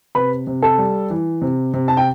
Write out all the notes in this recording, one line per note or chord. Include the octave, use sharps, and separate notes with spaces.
C3 B4 B5
C3
A4 A5
G3
E3
C3
C3
A5
G5